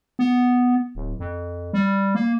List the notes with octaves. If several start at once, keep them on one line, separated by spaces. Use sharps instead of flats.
B3
D1
F2
G3
A#3